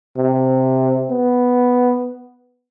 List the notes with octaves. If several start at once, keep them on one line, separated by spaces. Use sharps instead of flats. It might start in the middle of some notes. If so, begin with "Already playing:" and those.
C3
B3